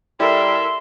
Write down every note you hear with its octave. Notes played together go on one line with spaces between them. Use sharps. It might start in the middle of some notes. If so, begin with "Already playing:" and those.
G3 E4 A4 A#4 E5 C6